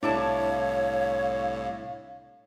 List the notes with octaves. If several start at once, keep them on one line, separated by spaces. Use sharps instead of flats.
C2 A2 D4 E4 C#5 F5 A5